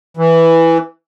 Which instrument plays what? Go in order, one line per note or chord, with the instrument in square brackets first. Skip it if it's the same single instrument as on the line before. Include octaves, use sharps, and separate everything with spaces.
[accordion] E3